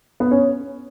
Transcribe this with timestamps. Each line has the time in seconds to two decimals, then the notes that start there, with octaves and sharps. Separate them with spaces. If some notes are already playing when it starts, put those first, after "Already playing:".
0.20 B3
0.31 C#4